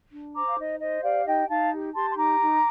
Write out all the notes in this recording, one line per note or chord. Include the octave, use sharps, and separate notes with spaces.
D4
C5 A#5 D6
F5
D#4 D#5
C5 D#5
G4 D5 F5
D#4 D#5 G5
D#4 F5 A5
G4
G4 A5 C6
C6
D#4 A#5 D6
D#4